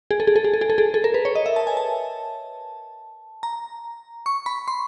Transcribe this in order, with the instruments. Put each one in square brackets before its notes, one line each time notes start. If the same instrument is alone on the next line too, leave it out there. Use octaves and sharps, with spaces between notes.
[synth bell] G#4
A4
G#4
A4
G#4
A4
G#4
A4
G#4
A4
A#4
B4
C#5
D#5
E5
A5
G#5
A5
A#5
C#6
B5
C6